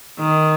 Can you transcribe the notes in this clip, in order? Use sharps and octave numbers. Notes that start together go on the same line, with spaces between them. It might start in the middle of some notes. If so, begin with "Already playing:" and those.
D#3